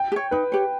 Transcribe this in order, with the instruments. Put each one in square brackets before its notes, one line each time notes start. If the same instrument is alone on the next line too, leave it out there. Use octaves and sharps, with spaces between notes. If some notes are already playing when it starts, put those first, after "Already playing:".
Already playing: [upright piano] G5
[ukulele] G4
C#5
[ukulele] D#4 [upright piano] B4
[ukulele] G4 C#5